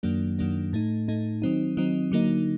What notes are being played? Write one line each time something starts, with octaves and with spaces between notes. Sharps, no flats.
F#2 D#3 F#3 A#3 D4
F#2 D#3 F#3 A#3 D4
A2 A3 D#4
A2 A3 D#4
D#3 F#3 C4 D#4
D#3 F#3 C4 D#4
D3 F#3 A#3 D#4